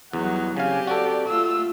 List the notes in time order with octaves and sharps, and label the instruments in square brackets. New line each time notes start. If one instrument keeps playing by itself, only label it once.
[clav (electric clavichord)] E2 [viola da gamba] F#3 G3 D#4 [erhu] F#5
[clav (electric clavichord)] C#3 F5 [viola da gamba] C4 G4 [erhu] G#5
[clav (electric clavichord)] F#4 A4 [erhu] D5
[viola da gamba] A3 F4 [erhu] E6